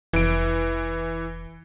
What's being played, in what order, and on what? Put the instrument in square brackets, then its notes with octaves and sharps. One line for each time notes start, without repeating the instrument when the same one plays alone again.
[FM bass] F1 [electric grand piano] E3 D7